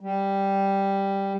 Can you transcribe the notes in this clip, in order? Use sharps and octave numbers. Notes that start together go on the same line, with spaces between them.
G3